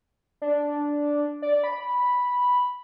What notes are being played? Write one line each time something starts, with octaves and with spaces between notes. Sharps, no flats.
D4
D5
B5